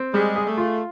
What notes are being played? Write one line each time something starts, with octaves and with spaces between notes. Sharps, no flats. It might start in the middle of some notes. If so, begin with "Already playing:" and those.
Already playing: C4
G3 G#3
G#4
A3
F4